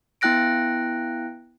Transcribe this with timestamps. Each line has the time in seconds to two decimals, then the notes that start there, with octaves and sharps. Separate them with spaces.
0.21 B3 E4 G5 F#6 A#6 D7